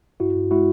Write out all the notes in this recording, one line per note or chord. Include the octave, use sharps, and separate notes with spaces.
G2 E4 F#4
G2
G#3 E4 F#4